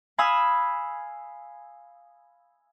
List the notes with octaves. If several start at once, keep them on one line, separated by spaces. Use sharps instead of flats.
F5 G#5 B5 D#6 E6